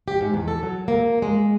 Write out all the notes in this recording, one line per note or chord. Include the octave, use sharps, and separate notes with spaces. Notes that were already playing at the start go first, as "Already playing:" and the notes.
G4
G#2
E2
A4
F#3
A#3
G#3